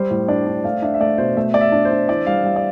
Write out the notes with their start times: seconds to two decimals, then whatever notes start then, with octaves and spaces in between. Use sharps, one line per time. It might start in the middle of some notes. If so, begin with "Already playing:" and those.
Already playing: G3 C5
0.11 A2
0.28 D4 D5
0.46 D4
0.64 A3 F5
0.82 D4 E5
0.94 E5
1.00 A3 D5
1.18 B2 C5
1.37 A3 E5
1.54 A3 D5
1.61 E5
1.72 D4
1.85 C5
1.91 D4
2.08 E3 D5
2.26 G3 F5
2.44 G3 F5
2.56 D5